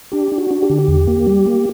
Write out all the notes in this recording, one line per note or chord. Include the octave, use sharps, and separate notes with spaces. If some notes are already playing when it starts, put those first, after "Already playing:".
D4 G4
D4
F#4
D4
G4
D3
E2
A#3
G3
A#3